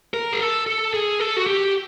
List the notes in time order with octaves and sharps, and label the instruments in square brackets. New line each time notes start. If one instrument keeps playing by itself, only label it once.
[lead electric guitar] A#4
G#4
A4
A4
G#4
A4
F#4
G4